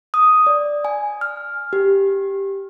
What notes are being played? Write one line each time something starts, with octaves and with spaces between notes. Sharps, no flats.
D#6
D5
G#5
F6
G4